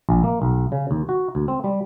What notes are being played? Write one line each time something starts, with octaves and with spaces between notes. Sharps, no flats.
A#1
A#3
B1
C#3
D#2
F#4
D2
C4
G3